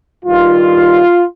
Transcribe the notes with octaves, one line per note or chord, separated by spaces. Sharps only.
G2 D#3 G3 F4